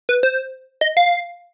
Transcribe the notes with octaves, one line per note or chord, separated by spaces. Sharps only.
B4
C5
D#5
F5